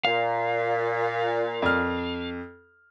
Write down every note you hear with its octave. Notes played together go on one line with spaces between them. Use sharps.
A#2 F5
F2 F6